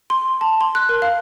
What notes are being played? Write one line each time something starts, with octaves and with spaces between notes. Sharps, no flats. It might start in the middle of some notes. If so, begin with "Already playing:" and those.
C6
A5
C6
F#6
A#4
F5